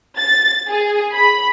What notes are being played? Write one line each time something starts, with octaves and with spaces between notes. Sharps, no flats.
A6
G#4
B5